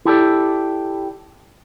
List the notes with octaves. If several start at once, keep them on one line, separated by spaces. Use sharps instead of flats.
E4 G4 A4 D5